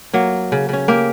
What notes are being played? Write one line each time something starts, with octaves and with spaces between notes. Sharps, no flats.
F#3 A#3
C#3
C#3 C#4
A#3 G4